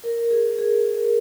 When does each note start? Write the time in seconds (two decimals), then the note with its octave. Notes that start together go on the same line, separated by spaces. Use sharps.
0.04 A#4
0.31 G#4
0.59 G#4
0.94 A#4
1.03 G#4